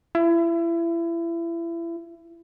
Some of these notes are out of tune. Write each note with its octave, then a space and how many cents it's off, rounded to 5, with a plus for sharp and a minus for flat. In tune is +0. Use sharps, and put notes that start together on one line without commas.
E4 +30